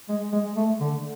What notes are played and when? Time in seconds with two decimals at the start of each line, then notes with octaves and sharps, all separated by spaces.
0.09 G#3
0.32 G#3
0.56 A3
0.81 D3